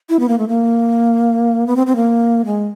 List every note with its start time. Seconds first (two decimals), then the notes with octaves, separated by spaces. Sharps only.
0.09 E4
0.20 B3
0.29 A#3
0.38 A3
0.48 A#3
1.67 B3
1.76 C4
1.87 C4
1.96 A#3
2.45 G#3